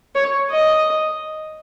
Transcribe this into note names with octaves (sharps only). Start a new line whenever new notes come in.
C#5
D#5